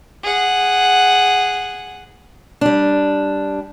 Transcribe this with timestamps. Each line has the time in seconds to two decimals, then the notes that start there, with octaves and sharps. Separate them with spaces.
0.23 G#4 F#5
2.61 G3 D4